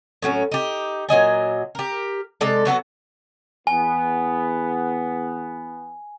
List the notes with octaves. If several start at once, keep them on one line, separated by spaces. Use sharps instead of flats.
A2 F#3 B3 C#4
D#4 G4
A#2 F#3 D#5 G#5
G4 A#4
C3 G#3 A4 D5
F#3 B3 F#4 A4
E2 B3 G#5